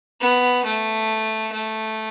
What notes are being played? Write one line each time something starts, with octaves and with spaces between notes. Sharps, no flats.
B3
A3
A3